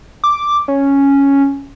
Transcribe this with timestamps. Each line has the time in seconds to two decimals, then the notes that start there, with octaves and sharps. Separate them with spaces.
0.24 D6
0.68 C#4